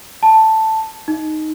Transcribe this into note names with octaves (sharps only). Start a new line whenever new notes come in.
A5
D#4